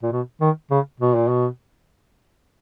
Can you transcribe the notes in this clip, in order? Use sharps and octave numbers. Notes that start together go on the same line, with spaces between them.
A#2
B2
D#3
C#3
B2
A#2
B2